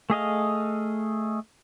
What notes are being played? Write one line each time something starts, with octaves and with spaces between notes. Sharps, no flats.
A3 G#4 D#5 F5